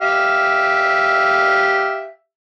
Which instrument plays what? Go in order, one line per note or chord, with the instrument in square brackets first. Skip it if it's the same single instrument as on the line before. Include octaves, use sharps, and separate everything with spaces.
[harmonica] G4 E5 F5